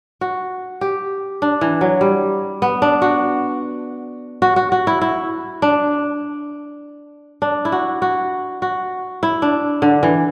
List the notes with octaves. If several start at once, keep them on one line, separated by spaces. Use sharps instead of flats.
F#4
G4
D4
E3
F#3
G3
B3
D4
F#4
F#4
F#4
F#4
E4
E4
D4
D4
E4
F#4
F#4
F#4
E4
D4
D3
E3